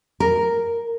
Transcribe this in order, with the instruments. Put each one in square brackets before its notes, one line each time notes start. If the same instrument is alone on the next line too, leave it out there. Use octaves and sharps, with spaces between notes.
[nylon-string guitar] A#4